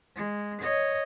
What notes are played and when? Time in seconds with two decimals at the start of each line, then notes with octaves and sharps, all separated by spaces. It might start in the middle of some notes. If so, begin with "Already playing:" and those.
0.16 G#3
0.61 C#5 D#5